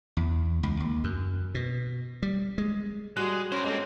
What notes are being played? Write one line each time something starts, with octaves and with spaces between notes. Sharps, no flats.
E2
C#2
D#2
F#2
B2
G3
G#3
G3 G#3 F#4 D5 F#6
C#4 A#4 C5
G#3 A#3 C4 A4